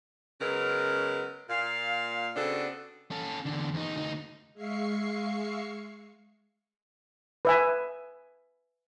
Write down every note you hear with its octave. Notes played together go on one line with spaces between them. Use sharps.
C#3 F#3 G#3 B3 C#4 A#4
A#2 F5
C#3 B3 C4 D4 F#4 A4
C#4 A4
E2 D3
E2 D#4
D2 D#4
G#3 E5 F5 C#6 C7 C#7
B4 E5 G#5